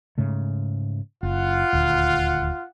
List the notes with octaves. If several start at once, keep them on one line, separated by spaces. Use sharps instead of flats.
G#2 C#3 A3
F#1 F4 F#5
D#1 D2